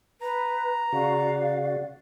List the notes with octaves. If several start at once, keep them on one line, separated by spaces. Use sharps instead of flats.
B4 A#5
C#3 F#4 D5 F5